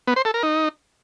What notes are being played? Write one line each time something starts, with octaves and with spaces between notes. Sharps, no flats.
B3
C5
A4
A#4
D#4